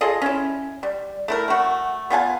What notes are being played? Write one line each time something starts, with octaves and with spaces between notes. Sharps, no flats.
F4 G#4 A4 D#5
C#4 E4
G3
A3 E4 A#4
A3 F#4
B3 F4 G#5 A5